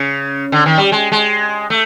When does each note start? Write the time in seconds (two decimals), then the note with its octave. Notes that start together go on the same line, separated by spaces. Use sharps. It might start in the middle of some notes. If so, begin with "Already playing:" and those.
Already playing: C#3
0.52 D3
0.66 D#3
0.78 G3
0.92 G#3
1.12 G#3
1.70 A3